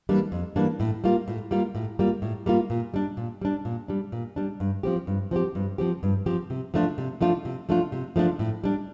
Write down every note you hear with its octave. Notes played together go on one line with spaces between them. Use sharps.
E3 G3 A#3 D4
F2
E3 G3 A#3 D4
A2
G3 A#3 F4
A2
G3 A#3 F4
A2
G3 A#3 F4
A2
G3 A#3 F4
A#2
G3 D4
A#2
G3 D4
A#2
G3 D4
A#2
G3 D4
G2
F3 C4 G4
G2
F3 C4 G4
G2
F3 C4 G4
G2
F3 C4 G4
C3
F3 A3 D4 F4
C3
F3 A3 D4 F4
C3
F3 A3 D4 F4
C3
F3 A3 D4 F4
A2
G3 D4